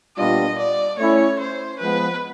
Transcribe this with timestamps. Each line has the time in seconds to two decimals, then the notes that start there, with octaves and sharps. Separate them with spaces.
0.17 A#2 G3 B3 D4 F4 D#5
0.58 D5
0.98 A3 C#4 E4 C#5
1.40 C5
1.79 F3 G#3 B3 B4